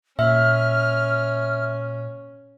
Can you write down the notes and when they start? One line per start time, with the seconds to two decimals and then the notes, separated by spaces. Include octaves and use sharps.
0.19 A#2 C#4 E5 F6